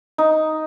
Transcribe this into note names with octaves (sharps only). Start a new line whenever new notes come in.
D#4